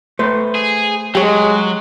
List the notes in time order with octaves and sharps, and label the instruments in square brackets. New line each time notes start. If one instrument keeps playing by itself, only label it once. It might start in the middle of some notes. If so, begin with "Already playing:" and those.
[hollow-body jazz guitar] A3 B4 C5
[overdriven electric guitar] G#4
[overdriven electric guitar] F#3 [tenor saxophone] G#3 [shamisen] G4 C#5